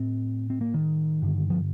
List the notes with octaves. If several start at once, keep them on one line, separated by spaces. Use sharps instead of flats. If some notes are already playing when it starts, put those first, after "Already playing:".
Already playing: A2 C4
C4
A#3
D#3
G2 D3
F3